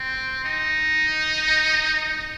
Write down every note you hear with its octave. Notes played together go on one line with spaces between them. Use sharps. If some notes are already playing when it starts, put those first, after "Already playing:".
Already playing: C4
D#4